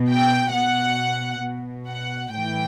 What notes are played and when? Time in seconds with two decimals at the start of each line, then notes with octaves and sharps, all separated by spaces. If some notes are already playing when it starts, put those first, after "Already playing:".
Already playing: B2
0.10 G5
0.53 B2 F#5
1.44 B2
1.88 F#5
2.33 A2 E3 G5